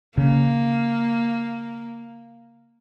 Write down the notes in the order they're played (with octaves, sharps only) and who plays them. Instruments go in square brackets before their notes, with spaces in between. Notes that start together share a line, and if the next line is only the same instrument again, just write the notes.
[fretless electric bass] C#3 [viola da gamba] A#3